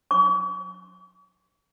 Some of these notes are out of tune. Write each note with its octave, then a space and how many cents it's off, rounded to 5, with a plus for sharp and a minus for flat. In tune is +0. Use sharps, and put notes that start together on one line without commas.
C#6 +40